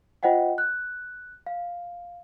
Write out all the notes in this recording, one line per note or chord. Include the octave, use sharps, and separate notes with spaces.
F4 C5 D#5 F#5 G5
F#6
F5